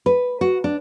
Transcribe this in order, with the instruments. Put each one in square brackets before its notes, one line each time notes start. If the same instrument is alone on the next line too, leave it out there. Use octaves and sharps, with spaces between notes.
[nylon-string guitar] B4
F#4
D4